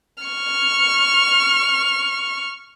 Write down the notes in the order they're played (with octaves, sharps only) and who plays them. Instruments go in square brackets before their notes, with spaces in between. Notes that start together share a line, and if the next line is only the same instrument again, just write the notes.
[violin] C#6 F6